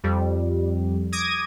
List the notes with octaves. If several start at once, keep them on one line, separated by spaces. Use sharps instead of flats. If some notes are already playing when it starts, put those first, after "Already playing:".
F2 G3
D6 D#6 G#6 A#6 D#7